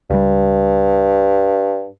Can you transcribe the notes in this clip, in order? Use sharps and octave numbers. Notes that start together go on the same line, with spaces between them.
C#2 G2 G3